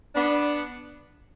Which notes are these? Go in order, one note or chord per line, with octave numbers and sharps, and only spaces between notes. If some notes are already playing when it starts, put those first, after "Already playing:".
B3 D4